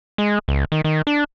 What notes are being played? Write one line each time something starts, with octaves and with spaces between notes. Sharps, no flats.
G#3
C#2
D#3
D#3
D4